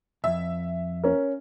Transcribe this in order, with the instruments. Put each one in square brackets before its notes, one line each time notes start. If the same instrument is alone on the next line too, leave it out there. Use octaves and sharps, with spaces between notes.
[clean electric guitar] B1 F2 [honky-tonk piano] E5
[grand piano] C#4 A#4